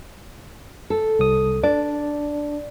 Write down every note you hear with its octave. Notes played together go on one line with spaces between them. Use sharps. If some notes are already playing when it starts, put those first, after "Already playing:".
A4
C2 D#6
D4 D5